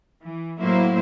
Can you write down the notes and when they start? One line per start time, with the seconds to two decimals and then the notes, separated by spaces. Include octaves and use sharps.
0.24 E3
0.61 A2 F#3 A#3 E4 C5